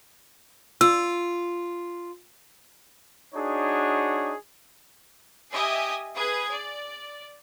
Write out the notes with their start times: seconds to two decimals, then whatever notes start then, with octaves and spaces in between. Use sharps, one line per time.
0.81 F4 E6
3.35 D4 D#4 F#4 G#4 C#5
5.52 G4 D#5 E5 G#5 D#6
6.15 G#4 B4 D#6 G#6
6.50 D5